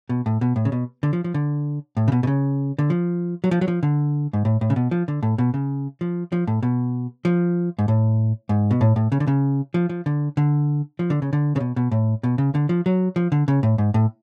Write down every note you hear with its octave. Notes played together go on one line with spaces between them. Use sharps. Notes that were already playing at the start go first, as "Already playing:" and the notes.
B2
A2
B2
A2
C#3
B2
D3
F3
F3
D3
A2
C#3
B2
B2
C#3
D3
F3
F#3
F3
F#3
F3
D3
G#2
A2
A2
C#3
B2
F3
D3
A2
B2
C#3
F3
F3
A2
B2
F3
G#2
A2
G#2
B2
A2
A2
C#3
D3
C#3
F3
F3
D3
D3
F3
D3
C#3
D3
C#3
B2
B2
A2
B2
C#3
D3
F3
F#3
F3
D3
C#3
A2
G#2
A2